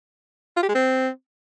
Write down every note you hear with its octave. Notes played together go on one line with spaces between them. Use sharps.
F4
G4
G#3
C4